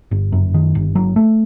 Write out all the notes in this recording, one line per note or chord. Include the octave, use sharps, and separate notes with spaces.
G1
F#2
D#3
G1
F#3
A3